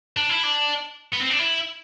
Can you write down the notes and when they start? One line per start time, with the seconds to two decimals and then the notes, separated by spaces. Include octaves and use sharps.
0.17 D4
0.30 E4
0.44 D4
1.12 B3
1.21 C4
1.30 D4
1.39 E4